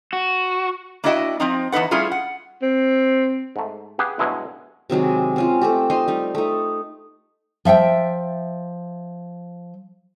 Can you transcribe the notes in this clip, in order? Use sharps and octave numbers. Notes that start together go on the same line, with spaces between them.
F#4
A#3 D4 E4 F#4 D#5 G5
F3 C4 D#4
E2 F3 D#4 B4 F#5
G3 A3 C#4 E4 F4 G#4
F#5
C4
G#2 A3
G4 G#4 B4 F5 F#5
G2 B2 F#3 G#3 E4
C3 D#3 F#3 G#3
C4 C#4 F4
A3 C4 G4
D#4 C5 D#5 C6
G3 D#4
A3 D#4
F3 E5 F#5 G5